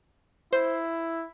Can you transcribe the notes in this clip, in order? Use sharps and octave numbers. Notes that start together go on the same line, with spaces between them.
E4 C5